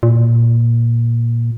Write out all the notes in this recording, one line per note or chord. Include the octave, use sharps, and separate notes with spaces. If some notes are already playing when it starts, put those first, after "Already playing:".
A#2